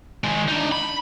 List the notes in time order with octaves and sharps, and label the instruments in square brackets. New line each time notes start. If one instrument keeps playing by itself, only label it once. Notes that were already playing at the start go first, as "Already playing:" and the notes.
[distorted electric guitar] D#3 G#3
D4 D#4
B5